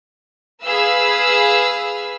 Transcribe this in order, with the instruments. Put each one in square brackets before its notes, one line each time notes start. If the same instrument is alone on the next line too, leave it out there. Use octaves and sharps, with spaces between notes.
[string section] G#4 B4 F5 E6